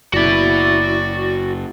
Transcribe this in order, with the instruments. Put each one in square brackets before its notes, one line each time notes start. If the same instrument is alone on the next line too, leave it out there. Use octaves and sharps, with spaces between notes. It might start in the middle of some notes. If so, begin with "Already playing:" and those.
[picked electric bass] F#1 [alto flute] E4 [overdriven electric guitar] F#4 B5 [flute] D5